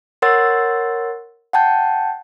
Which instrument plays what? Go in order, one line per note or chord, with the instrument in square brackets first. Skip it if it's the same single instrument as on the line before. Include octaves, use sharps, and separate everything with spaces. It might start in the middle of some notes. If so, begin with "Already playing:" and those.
[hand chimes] A#4 C#5 F#5 C6 E6 A6
F#5 G5 A5 G6